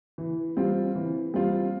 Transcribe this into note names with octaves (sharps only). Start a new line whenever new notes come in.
E3
G3 C4 F4
E3
G3 C4 F4